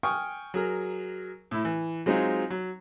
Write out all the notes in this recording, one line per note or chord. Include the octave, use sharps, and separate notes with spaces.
G5 G#5 C#6 D#6 F6
F#3 G#4 A#4
A2 E4
E3
F#3 G#3 C4 D#4 F4
F#3